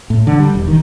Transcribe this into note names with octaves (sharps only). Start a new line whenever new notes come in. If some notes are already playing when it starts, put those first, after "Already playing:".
A2
D3
G3
E1
D#3